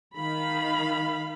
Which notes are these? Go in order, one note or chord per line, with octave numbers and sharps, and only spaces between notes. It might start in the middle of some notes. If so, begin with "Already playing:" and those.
D#3 F5 B5